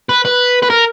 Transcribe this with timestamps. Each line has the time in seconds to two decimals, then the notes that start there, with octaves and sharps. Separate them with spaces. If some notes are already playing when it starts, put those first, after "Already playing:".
0.09 B4
0.25 B4
0.62 B4
0.70 A#4